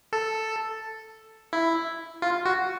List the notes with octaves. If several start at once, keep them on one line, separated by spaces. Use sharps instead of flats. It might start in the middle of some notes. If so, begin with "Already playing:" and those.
A4
E4
F4
F#4